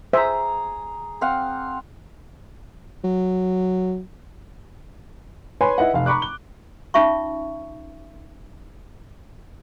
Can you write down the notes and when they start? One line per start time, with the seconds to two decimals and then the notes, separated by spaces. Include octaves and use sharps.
0.13 G#4 C5 E5 A#5
1.21 C4 F5 F#5
3.04 F#3
5.61 B4 C#5 G#5 B5 C6
5.78 E4 B4 D#5 F#5
5.94 F1 F5
6.06 A#5 B5 C#6 D6 F#6
6.22 G7
6.94 C#4 D#4 F4 E5 C#6